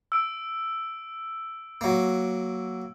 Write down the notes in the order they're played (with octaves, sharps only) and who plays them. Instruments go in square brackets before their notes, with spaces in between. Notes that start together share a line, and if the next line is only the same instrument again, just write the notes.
[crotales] E6 D7
[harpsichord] F#3 A#3